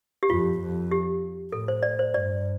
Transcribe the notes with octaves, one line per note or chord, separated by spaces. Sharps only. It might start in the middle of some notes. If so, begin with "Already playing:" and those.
G4
F2 F4
F2
G4
A2 A4
C5
D5
C5
G2 D5